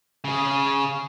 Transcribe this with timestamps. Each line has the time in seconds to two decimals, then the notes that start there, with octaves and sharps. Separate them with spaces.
0.24 C#3 G#4